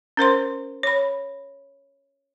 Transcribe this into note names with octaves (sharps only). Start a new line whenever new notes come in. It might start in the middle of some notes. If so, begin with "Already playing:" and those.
C#4 A#4 C5 C6
C#5 B5